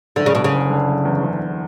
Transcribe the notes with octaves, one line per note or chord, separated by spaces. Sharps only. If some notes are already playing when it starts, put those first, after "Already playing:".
F#1 D3
C#3
B2 D3
C#3
F#1
D3
F#1
E2
F#1
F#1